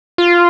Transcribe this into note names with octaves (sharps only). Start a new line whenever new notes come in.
F4